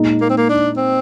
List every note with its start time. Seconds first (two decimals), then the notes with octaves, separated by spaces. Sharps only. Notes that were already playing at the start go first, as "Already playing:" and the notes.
Already playing: A#2 G#3 D#4
0.21 A#3
0.30 C4
0.37 A#3
0.49 D4
0.77 C4